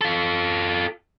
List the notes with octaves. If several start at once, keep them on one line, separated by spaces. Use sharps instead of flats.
F4 A4